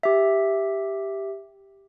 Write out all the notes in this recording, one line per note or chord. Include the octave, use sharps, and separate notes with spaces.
G4 E5